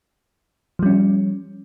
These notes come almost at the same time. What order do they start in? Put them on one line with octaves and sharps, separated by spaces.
F3 G3 C#4